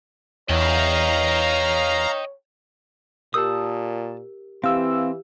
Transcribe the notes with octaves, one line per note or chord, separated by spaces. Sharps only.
E2 C#5 D#5 F5 G5 A#5
A#2 G4 A#4 A5 D#6 E6
E3 C4 G4 F5 E6